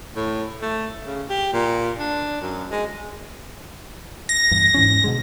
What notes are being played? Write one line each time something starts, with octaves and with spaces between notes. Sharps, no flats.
A2
A3
C#3
G4
A#2
D4
F#2
G#3
A#6
E2 G2
G#2 E3 C#4
B2 D3 G#3